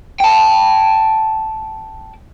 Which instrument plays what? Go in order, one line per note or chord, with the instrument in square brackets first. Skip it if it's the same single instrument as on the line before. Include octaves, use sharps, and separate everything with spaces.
[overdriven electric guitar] G5 A5